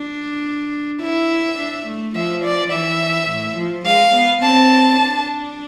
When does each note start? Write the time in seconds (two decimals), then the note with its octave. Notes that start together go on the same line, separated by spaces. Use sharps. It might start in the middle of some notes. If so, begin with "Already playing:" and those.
Already playing: D4
1.02 E4 E5
1.58 D4
1.86 A3
2.15 F3 E5
2.44 D5
2.72 E3 E5
3.29 A2
3.57 F3
3.85 G#3 F5
4.15 B3
4.42 C4 A5
5.00 D4